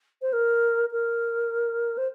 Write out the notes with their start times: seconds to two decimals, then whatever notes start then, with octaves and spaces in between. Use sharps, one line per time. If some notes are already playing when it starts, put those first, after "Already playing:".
0.22 C5
0.32 A#4
0.91 A#4
1.97 C5